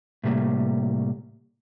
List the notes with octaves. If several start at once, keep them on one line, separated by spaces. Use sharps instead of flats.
A2 C3 G3 A#3